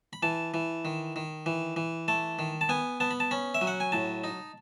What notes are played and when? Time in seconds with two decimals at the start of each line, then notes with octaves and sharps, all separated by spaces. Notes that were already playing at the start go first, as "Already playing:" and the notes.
0.13 B5
0.23 E3 A5
0.54 E3
0.85 D#3
1.16 D#3
1.46 E3
1.76 E3
2.08 A3 A5
2.39 D#3
2.61 A5
2.69 B3 G#5
3.00 B3 A5
3.11 B5
3.20 A5
3.31 C#4 B5
3.54 E5
3.61 F#3
3.67 F#5
3.80 G#5
3.92 A2 A5
4.24 D#4